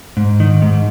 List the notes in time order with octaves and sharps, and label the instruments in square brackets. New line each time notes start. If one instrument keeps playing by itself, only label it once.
[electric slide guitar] G#2
D#3
G#2